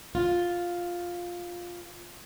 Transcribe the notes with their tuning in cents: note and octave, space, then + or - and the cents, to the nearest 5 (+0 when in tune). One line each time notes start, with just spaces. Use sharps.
F4 +5